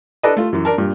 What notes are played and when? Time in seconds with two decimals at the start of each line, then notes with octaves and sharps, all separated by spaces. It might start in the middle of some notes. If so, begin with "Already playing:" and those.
0.23 D4 A4 B4 D5 D#5
0.37 A3 F4
0.53 F#2 E3
0.65 D4 A#4 A5
0.78 G2 A#2